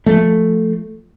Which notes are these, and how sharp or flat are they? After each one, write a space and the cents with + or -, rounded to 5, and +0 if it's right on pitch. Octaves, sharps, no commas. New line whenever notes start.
F3 +0 A3 +0